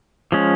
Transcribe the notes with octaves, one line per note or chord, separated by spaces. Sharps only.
F3 G#3 C#4